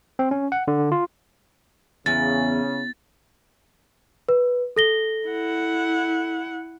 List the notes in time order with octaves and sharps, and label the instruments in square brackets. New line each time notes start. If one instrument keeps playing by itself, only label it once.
[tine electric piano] C4
C#4
F#5
D3
F4
[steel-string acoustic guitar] E2 [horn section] C#3 [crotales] A6
[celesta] B4
A4 A#6 G7
[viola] E4 F#5